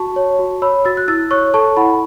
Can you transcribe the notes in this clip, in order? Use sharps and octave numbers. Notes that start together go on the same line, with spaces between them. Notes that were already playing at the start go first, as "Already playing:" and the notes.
Already playing: F#4 A5 C#6
C#5
F#4
C#5 B5 E6
F#4 E6 A6
F#6
E4 E6 A6
C#5 C#6 F#6
A4 A5 C#6
E4 F#5 B5